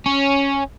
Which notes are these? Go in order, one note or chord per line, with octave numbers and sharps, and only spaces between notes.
C#4